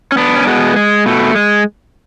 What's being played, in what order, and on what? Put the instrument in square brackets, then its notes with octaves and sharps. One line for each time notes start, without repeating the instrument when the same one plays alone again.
[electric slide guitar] C#4
B3 D4
C#4
B2 G#3 B3
G#3
B2 A3
G#3